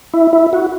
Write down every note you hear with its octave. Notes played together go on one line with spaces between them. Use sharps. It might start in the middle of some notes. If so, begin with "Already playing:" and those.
E4
E4
F#4